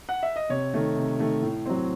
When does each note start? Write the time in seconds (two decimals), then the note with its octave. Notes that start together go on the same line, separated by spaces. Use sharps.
0.09 F#5
0.23 E5
0.36 D#5
0.49 C3 C#5
0.74 D#3 A3
0.97 C3
1.20 D#3 A3
1.42 A2
1.66 F#3 C4